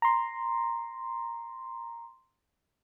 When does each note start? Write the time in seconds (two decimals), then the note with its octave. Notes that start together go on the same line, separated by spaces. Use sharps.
0.02 A#5 C6